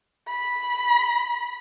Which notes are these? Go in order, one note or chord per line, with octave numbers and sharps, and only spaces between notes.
B5